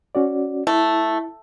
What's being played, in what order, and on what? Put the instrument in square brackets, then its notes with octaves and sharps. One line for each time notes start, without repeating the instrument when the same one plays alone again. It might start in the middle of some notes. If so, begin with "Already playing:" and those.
[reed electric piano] C#4 F#4 D5
[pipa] A3 [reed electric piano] E4